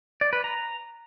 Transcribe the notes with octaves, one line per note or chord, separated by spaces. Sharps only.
D5
B4
A#5